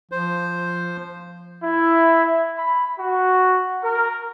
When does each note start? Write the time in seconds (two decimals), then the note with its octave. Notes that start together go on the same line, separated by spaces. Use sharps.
0.12 F3 C5
1.63 E4
2.57 B5
2.98 F#4
3.82 A#4